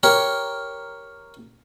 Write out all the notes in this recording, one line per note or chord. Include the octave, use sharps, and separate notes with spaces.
G4 A#4 C#5